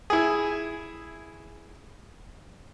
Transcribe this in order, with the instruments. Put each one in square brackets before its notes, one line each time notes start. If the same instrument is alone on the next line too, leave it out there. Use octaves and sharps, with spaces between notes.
[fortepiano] E4 G#4